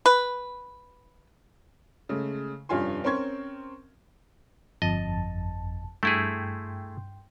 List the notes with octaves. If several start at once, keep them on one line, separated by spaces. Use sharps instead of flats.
B4
C#3 G#3 A3
F1 G2 C#4 F4 G#5 C6
C4 C#4 A#4 C6 C#6 G#6
G1 F2 D#5 A5
G2 A3 E4 G#4 G5 C6